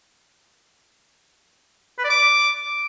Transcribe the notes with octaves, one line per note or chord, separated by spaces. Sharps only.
B4
D5
D6